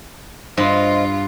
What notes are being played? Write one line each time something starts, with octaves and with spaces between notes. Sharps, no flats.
G2 F4 C5 D#5